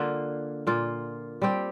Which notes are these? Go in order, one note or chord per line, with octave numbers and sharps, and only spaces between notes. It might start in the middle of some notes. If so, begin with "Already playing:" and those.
Already playing: D3 A#3 F4
A#2 A#3 F4
G3 C4 G4